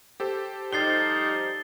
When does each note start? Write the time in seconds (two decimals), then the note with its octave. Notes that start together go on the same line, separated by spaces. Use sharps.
0.20 G4 A4 C5
0.73 F3 G3 D#4 A6 C7 G7